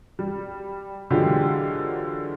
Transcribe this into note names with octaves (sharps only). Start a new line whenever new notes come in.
G3
D3 E3 F#3 G#3 F4 G4